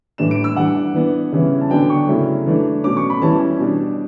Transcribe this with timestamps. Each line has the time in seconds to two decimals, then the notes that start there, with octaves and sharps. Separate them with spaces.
0.18 A2 E3 G3 D4 E7
0.31 D7
0.44 E6
0.56 E3 G3 D4 F#5
0.94 E3 B3 D4
1.32 C#3 E3 G3 C#4 E4
1.61 A5
1.70 D3 F#3 B3 D4 G5
1.90 C#6
2.08 C#3 F#3 A3 C#4 E4
2.46 E3 A3 D4
2.84 B2 F#3 A3 C#4 D6
2.97 C#6
3.10 B5
3.22 E3 G3 C#4 E4 A5
3.59 B2 G3 D4